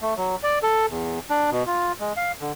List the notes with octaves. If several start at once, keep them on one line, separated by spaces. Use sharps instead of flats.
A3
F#3
D5
A4
E2
D4
B2
F4
G#3
F5
D3